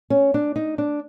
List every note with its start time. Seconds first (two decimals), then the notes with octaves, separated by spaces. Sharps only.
0.10 C#4
0.34 D4
0.56 D#4
0.78 D4